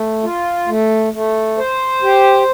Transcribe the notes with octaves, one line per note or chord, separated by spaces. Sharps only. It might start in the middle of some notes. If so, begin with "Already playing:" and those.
Already playing: A3
F4
A3
A3
C5
G4